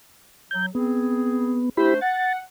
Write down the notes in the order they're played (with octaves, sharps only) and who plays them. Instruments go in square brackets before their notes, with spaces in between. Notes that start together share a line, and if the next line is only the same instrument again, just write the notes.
[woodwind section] F#3 [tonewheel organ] G6
[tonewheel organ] B3 [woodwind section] C4 G#4
[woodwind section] A3 D4 C5 [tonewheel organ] E4 G4 B5
[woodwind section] F#5 [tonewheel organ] A6